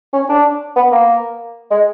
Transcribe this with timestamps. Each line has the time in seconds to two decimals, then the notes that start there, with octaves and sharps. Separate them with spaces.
0.13 C#4
0.29 D4
0.76 B3
0.92 A#3
1.71 G#3